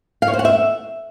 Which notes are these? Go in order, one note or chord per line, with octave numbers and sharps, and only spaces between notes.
F5
C#5
C5
F#5
E5